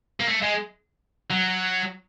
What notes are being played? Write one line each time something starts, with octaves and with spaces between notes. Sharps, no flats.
A#3
A3
G#3
F#3